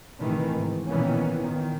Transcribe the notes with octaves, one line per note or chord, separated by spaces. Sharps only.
A2 C3 D#3 E3 A3
G#2
A#2 D#3 E3 B3 C#4
A#2 D#3